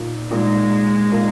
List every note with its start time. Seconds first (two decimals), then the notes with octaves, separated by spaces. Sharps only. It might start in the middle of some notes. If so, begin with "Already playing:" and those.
Already playing: A#2 A#3 D#4
0.30 A#2 G#3 A#3 D#4
1.11 A#2 A#3 D#4